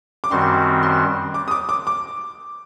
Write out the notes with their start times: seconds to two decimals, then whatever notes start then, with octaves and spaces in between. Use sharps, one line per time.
0.24 D6
0.31 F#2 D#3 G3 C4 F#4 C6
0.83 C6
1.34 D6
1.48 D#6
1.51 D6
1.69 D6
1.87 D6